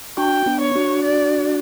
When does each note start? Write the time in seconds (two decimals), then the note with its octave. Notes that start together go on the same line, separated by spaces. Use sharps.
0.17 D4 F#4 G5
0.46 B3 D4
0.61 C#5
0.75 D4 F#4
1.04 D5